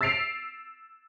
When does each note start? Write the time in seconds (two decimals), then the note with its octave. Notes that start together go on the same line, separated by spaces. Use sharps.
0.01 E6 A6 B6 C7 D7 F7